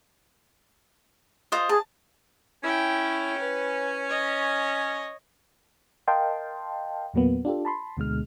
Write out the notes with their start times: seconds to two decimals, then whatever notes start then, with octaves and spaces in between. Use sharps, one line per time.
1.52 F4 C5 D#5
1.69 G#4 A5
2.63 C#4 E4 G5
3.38 B4
4.09 C#5 D#5
6.07 A#4 D#5 F5 G5 A5 C6
7.14 E2 A#2 F#3 A#3 B3
7.45 D4 F4 G4 A4
7.65 A5 B5 C6
7.97 D2 B2 D3 G#3 F6